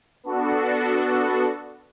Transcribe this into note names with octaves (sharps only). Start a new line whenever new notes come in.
B3 D4 F#4 A4